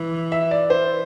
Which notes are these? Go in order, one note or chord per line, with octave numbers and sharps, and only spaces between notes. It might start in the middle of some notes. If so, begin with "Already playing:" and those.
Already playing: E3
E5
D5
C5